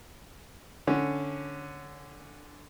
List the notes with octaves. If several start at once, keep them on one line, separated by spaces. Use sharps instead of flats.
D3 C#4